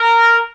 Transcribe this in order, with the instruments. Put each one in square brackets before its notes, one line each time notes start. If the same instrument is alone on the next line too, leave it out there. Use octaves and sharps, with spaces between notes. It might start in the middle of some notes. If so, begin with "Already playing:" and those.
Already playing: [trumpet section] A#4